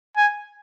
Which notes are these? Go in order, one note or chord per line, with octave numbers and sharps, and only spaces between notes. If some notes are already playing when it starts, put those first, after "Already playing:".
G#5